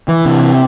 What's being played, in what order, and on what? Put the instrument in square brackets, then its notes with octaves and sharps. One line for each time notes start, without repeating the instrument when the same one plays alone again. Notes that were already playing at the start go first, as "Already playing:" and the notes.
[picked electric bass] E3
C3